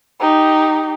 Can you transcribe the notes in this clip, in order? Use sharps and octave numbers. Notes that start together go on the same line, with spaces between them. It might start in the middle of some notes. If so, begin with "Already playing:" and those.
D#4 G4